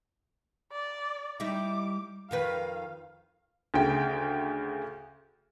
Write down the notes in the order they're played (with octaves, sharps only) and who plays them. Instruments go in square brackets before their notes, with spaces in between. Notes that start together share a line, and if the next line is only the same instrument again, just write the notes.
[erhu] D5
[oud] G3 D#4 E4 [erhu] D6
[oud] F2 D#3 B4 [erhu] F5
[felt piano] D2 C#3 G5